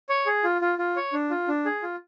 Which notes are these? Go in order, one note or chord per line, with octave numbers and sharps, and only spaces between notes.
C#5
G#4
F4
F4
F4
C#5
D4
F4
D4
G#4
F4